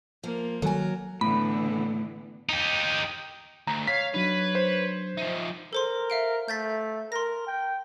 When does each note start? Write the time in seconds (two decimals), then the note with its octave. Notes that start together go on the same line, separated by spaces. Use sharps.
0.24 F3 A#3
0.62 D#3 E3 F#3 G3 A4 A#4 G#5
1.21 A2 D3 E3 B3 B5
2.49 D#4 G4
3.67 D2 A#5
3.88 C#5 F5 B6
4.14 F#3 D4 D#4 B4
4.55 C5
5.17 F3 D#4 E5
5.73 A4 A#4 C5 C6
6.10 E5 F5 D7
6.48 A3 G6 A6 B6
7.12 A#4 C6 A#6
7.47 G5